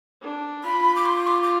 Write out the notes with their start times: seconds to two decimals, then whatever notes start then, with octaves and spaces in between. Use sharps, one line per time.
0.22 D4
0.64 F4 B5
0.96 D6
1.06 C6
1.27 D6
1.43 D6